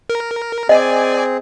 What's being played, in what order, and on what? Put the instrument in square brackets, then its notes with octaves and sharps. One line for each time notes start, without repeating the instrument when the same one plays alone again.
[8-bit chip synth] A#4
[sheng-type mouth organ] C4 G#4 [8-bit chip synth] D5 G#5 [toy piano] D#5